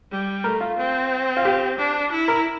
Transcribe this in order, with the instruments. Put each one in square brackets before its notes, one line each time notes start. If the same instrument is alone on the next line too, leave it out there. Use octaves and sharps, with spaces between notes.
[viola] G3
[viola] A3 [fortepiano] A#4
[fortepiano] F4
[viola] C4
[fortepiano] F4
G4
[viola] D4
E4
[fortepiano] A#4